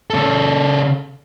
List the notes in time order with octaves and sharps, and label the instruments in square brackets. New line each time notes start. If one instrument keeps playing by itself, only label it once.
[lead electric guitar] C#3 A4